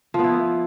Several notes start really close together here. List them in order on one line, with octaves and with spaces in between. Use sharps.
F3 B3 E4